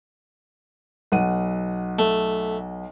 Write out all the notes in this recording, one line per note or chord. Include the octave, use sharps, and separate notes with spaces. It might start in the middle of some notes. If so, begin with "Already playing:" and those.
B1 F#5 D#7
A3